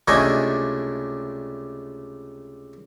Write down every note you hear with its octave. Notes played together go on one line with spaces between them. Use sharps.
C#2 C3 A3 D4 D#5 G#5